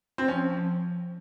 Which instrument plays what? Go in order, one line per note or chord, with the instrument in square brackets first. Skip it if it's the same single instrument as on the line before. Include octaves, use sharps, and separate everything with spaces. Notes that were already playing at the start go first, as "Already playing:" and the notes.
[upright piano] C4
[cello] F3 [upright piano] C#4